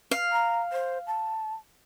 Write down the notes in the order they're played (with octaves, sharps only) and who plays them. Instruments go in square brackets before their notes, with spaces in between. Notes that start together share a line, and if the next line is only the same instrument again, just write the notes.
[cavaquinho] F5
[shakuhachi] A#5
C5
A5